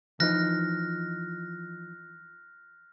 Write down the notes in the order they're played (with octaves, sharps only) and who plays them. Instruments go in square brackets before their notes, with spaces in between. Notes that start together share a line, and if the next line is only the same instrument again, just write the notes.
[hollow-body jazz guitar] E3 F3 D#4 [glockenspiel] F6 F#6 A#6